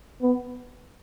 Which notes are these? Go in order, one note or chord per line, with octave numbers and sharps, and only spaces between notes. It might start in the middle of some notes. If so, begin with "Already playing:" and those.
B3